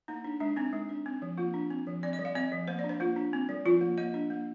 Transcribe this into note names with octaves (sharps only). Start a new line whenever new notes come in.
A#3 D#4
D4
G#3 D4
C4 D#4
G#3
D4
C4
F3
A#3 F4
D4
C4
F3
C4 D5
D#5
G3
F5
C4 D#5
F3
A#3 C5
D5
D4
C5
A#3 F4
D4
C4
G3
F3 F4
A#3
A#3 D#5
D4
A#3